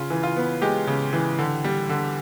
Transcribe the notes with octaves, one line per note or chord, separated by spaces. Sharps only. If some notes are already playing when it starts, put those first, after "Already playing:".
Already playing: C#3 F4
E3
F4
B3
G#3 G4
C#3
E3
D3
G3
D3